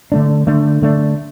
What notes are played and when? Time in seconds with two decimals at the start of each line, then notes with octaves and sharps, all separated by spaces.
0.12 D3 A3 D4
0.47 D3 A3 D4
0.82 D3 A3 D4